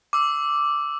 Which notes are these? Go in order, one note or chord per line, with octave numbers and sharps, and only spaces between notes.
D6 E6